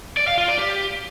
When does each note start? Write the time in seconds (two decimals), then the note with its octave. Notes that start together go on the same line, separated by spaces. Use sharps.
0.17 D5
0.28 F5
0.38 F4
0.48 D5
0.59 G4